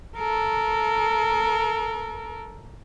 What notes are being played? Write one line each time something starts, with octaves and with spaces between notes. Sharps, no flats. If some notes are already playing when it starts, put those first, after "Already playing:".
A4 A#4